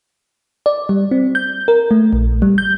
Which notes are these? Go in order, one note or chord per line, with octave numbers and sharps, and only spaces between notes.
D5
G3
C4
G6
A#4
A3
A#1
G3
G6